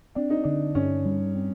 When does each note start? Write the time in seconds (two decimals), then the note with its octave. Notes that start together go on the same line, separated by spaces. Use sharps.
0.15 C4 D4
0.30 D#4
0.43 D3 D4
0.75 G2 C#4
1.05 G3
1.35 C4